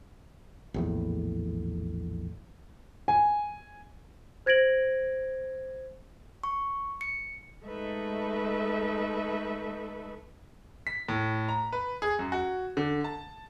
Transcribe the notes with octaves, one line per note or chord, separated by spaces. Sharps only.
A#1 E2 A2
G#5
C5 G#6 A#6 D7 F#7
C#6
C#7
G#3 A3 D#4 A4 B4 E5
B6
A2
A#5
B4
G#4
F#2
F#4
D3
A5